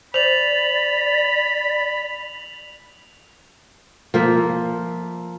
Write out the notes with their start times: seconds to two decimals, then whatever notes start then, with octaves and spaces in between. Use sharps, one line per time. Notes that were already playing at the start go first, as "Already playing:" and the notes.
0.14 C5 D5 B5 F7 F#7
4.14 F3 A#3 E5